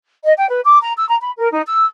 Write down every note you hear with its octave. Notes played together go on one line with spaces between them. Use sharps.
D#5
G5
B4
D6
A#5
E6
A#5
B5
A#4
D#4
E6